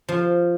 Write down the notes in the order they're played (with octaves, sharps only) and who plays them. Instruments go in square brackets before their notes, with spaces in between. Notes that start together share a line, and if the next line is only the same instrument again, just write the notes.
[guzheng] F3